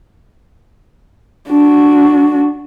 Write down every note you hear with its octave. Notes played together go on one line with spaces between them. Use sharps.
D4 F#4